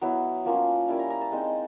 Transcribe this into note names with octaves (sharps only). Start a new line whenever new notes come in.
F#3 B3 E4
F3 A#3 C#4 F4
G3 A#3 C#4 E4 A5
A#5
A#5
A5
G#3 C4 D#4